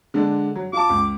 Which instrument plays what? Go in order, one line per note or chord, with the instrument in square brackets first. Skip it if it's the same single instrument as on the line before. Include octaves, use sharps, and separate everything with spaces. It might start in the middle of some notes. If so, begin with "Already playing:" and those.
[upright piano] D3 G#3 D4
F#3
[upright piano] F4 A5 [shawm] D6
[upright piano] C#2